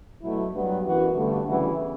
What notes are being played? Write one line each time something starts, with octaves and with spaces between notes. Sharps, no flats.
B2 F#3 A3 E4
G2 F#3 B3
F#2 E3 B3 F#4
G2 D3 A3
C#3 E3 G3 B3 F#4